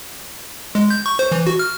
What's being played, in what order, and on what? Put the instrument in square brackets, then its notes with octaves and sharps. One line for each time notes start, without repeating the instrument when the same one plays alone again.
[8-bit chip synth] G#3
G6
C#6
C5
E3
F#4
F6